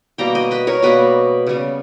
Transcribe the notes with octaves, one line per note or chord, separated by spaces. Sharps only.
B2 G3 A#3 G5 A#5
D#5 G5
B4 D#5
A#4 C#5
B2 G3 A#3 B4 D#5
C#3 G3 B3